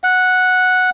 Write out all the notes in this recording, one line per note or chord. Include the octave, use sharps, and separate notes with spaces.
F#5